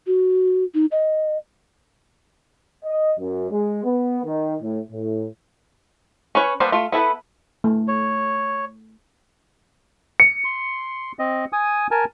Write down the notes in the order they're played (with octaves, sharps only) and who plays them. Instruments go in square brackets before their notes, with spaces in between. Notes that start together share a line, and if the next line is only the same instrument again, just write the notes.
[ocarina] F#4
D#4
D#5
[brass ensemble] D#5
F#2
G#3
B3
D#3
A2
A2
[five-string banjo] C#4 B4 C#5
G3 A#3 B3 C5 A5
A3 F4
B3 E4 A4 B4
[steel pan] A3
[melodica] C#5
[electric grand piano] C#7
[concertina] C6
C4 D#5
G#5 D#6
A#4 G#5 A5